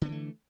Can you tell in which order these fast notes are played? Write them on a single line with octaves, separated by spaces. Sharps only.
D3 B3 E3 A3